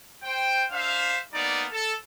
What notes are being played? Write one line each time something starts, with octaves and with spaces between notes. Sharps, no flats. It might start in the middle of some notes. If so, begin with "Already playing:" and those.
C5 G5
D4 C5 E5 F5
G3 A#3 B3 D#4 D5
A4